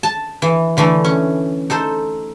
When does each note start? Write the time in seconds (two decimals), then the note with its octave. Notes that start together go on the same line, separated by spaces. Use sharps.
0.03 A5
0.42 E3
0.77 D3 E3 A3
1.04 C#4
1.70 D#4 A4 C5